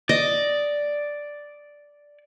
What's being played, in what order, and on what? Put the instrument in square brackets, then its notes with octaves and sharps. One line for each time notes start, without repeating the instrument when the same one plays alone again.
[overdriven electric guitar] D5 [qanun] D#5